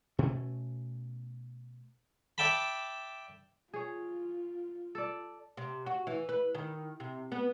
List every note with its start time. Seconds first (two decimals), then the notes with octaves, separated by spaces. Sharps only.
0.19 B2 A3 C#4
2.38 D5 E5 G5 A5 B5
3.74 F4 G#4 C#5
4.95 A4 D5
5.57 C3
5.86 F#4
6.07 E3
6.29 B4
6.55 D#3
7.00 C3
7.32 B3